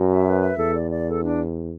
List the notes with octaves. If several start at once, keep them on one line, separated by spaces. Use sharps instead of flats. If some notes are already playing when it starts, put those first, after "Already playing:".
Already playing: F#2 F#4
E5
B4
E5
E2 A4
D5
D5
A4
D4